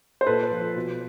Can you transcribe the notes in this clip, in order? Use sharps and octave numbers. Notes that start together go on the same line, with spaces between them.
C5
A#2 A4 B4
F3
B2